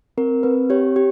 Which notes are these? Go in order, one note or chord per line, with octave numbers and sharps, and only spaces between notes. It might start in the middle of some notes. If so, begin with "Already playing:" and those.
C4 A#4
C4 B4
G4 C#5
G4